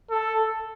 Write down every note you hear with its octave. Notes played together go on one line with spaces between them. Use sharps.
A4